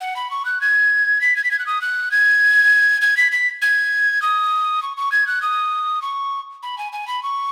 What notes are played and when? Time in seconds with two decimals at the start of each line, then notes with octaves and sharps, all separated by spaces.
0.01 F#5
0.16 B5
0.31 C#6
0.45 F#6
0.61 G#6
1.21 B6
1.36 G#6
1.44 B6
1.51 G#6
1.59 F#6
1.66 D#6
1.81 F#6
2.11 G#6
3.02 G#6
3.17 B6
3.32 B6
3.62 G#6
4.22 D#6
4.83 C#6
4.97 C#6
5.12 G#6
5.27 F#6
5.42 D#6
6.02 C#6
6.63 B5
6.78 G#5
6.92 G#5
7.07 B5
7.23 C#6